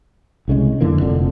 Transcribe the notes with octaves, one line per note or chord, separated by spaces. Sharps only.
C2 C#3 G#3
F2 D3 E3 A#3
F1 F2 D3